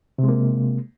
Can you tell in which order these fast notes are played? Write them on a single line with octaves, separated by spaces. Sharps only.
C3 G#3 A#3